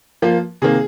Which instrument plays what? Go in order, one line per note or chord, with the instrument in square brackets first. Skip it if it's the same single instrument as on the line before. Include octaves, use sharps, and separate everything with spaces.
[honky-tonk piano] F3 A#3 F4
C3 D#3 A#3 G#4